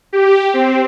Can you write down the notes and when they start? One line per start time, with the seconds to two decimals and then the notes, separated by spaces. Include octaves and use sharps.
0.13 G4
0.54 C4